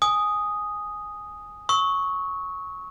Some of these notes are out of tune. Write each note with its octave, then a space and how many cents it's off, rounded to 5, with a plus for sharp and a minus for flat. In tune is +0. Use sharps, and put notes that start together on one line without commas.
G#5 +0 D#6 +0
C#6 +0 E6 -45